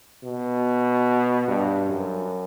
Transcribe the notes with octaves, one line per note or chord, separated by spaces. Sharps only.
B2
G2
F#2